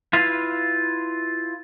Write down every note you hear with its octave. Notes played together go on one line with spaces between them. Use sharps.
E4 F4 B4 F5